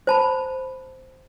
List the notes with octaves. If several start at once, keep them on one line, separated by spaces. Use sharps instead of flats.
C5 A5 B5